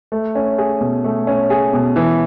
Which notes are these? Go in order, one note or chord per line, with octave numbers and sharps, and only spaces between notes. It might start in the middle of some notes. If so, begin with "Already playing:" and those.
A3
C#4
G#4
B2
A3
C#4
G#4
B2
E3